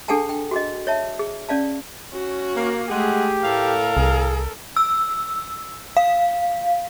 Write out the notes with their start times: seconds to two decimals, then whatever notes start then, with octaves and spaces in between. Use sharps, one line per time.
0.08 D4 G#4 A4 F#5 G#5 A5
0.29 G5
0.51 F#4 G#4 D#5
0.87 C#5 E5 A5
1.19 G#4
1.49 C#4 D5 F5 A5
2.13 C#4 F#4
2.55 A#3
2.88 G#3 A3 G4 G#4 F#5
3.43 A2 A4 A#4 F5
3.97 C2 G#4
4.76 E6
5.97 F5